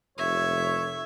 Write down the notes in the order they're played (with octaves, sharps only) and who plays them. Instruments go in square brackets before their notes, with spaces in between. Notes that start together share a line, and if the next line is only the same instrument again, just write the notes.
[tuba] F1 [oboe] C#5 [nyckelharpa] E5